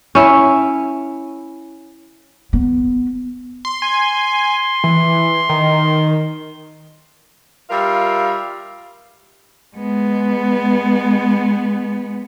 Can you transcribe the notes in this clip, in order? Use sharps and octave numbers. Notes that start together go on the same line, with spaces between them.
C#4 E4
B3
C6
G#5 C6
E3
D#3
G3 F4 A#4 E5 F5
G#3 B3